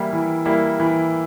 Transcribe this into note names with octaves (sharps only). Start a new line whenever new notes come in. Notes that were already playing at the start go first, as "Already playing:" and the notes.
Already playing: E3 G3 A#3 E4
E3
G3 A#3 E4
E3